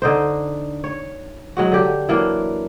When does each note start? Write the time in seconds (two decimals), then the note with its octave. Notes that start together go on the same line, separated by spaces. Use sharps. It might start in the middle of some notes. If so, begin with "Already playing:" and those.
0.02 D3 D#4 C5
0.84 C#5
1.57 F#3 G#3 F#4
1.72 D3 G4
2.09 E3 F#3 A#3 D4